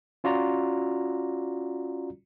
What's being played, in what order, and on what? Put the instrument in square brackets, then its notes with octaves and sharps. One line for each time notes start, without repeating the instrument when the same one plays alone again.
[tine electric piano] C#4 F4 F#4 D5 A#5